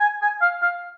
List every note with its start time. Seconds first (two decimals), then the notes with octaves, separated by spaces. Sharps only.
0.01 G#5
0.22 G#5
0.42 F5
0.62 F5